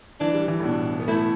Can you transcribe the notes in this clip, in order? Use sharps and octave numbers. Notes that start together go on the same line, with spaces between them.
E3 D4
G3
E3
A2
B2 D4
B3
A3 E4